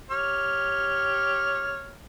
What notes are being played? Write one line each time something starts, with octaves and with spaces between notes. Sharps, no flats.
G4 C#5 F6